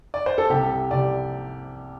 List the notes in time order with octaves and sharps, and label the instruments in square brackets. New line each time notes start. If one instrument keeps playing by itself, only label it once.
[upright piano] D5
C5
A4
C2 C3 G4
C2 C3 D5